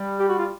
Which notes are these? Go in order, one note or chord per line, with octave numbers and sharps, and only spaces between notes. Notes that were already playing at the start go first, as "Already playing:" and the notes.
Already playing: G3
G4
F#4
F4